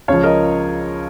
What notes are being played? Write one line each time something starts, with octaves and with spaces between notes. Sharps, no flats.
C#2 C#3 F3 C#5 F5
A#4 D#5